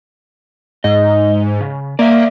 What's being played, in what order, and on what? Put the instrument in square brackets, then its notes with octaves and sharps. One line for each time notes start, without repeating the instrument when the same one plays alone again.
[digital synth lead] G#2 [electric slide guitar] D#5
[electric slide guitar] C#3
[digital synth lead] A#3 [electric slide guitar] D5 E5